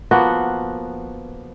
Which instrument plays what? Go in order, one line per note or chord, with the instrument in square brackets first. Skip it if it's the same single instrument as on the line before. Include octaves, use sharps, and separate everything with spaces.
[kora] F3 A#3 B3 F#4